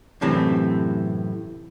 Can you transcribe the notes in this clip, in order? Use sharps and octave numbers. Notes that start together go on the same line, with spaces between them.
F#2 A2 C3 E3 A3 C4